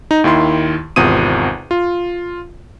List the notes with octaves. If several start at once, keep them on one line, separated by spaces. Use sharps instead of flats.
D#4
D#2 D#3 E4 C6
G#1 E2 C3 F4 D#6 D#7
F4